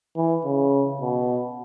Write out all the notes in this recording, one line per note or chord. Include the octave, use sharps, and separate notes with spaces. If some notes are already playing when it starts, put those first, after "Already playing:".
E3
C#3
B2